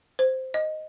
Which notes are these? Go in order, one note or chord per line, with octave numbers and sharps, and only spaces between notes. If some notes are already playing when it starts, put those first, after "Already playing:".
C5
D#5